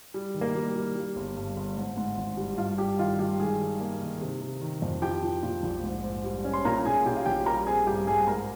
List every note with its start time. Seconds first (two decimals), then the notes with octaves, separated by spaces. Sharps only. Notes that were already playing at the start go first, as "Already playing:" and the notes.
0.14 G3
0.34 D#3
0.41 A#3 A#4
0.55 G3
0.76 G3
0.96 G3
1.16 G1
1.37 G2
1.56 G1
1.77 G#2
1.97 G#2
2.18 G#1
2.37 G3
2.58 G2 F4
2.78 G2 G4
2.99 D#3 F4
3.19 G2 G4
3.39 D#3 G#3 G#4
3.60 G3
3.80 A#3
4.01 D#3
4.21 C3
4.41 C3
4.61 D#3
4.82 F2
5.02 F3 G4 G5
5.23 F3
5.43 A#2
5.63 A#1
5.84 G#2
6.04 G#2
6.24 G3
6.44 C#4
6.53 C6
6.65 A#2 A#4 A#5
6.85 A#2 G#4 G#5
7.06 A#2 G4 G5
7.17 F5
7.26 A#1 G4 G5
7.46 G3 A#4 A#5
7.67 C4 G#4 G#5
7.87 G2 G4 G5
8.07 G2 G#4 G#5
8.27 G#2 A#4 A#5